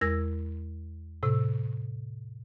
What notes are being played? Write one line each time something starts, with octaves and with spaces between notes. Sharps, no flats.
E2 G#3 A#4 E6 G#6 A#6
A2 C3 E6